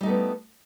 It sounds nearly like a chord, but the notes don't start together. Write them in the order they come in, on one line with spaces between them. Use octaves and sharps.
G3 D#4 A3 B3